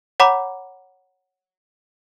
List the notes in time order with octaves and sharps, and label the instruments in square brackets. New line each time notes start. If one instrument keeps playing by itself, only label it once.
[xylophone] C#5 F#5 A#5 B5 D6